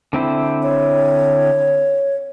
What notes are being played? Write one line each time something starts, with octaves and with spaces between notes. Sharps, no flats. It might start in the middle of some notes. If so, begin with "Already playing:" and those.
D3 C4 E4
C#5